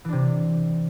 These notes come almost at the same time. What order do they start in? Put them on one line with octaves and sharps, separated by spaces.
E3 D4 C3